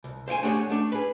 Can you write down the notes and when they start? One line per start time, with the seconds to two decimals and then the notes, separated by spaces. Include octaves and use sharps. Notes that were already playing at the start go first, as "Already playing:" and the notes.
0.04 C2
0.28 C5 F5 G5 G#5
0.43 A3 D4 G4 G#4 C#5 F#5
0.70 A3 D4
0.92 G#4 B4